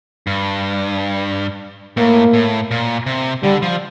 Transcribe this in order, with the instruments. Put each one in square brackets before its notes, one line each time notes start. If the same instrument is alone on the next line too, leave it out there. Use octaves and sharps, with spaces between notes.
[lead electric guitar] G2
[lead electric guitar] A2 [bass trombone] A#3
[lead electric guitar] A2
A#2
C3
[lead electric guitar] D3 [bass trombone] G3
[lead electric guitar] F3